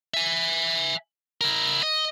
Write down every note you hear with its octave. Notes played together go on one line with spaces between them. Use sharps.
E5 G#5
E4 A#4
D#5